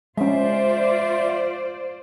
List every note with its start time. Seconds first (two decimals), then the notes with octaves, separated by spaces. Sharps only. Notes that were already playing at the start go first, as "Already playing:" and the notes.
0.17 G#3 C#4 F4 C5 D5 E5